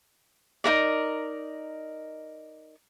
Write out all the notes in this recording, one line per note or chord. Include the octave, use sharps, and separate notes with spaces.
D#4 E4 A#4 D5